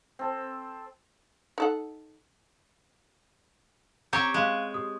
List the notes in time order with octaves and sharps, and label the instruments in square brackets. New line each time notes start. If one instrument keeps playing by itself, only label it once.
[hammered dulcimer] C4 A4
[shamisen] D#4 A4 F#5
[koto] C4 G4 C#5 [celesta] A#5
[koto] G#3 [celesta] F5 F#6
[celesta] G4 D#6